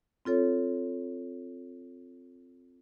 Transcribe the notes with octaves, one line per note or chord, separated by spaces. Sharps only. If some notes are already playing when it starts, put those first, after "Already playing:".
C4 F4 A4 C#5